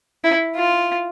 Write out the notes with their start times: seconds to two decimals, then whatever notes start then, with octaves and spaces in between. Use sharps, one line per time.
0.24 E4
0.56 F4